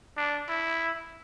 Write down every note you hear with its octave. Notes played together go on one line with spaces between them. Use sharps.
D4
E4